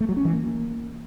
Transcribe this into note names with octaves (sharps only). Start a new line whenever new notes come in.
A3
F#3
C#4
E3
A#3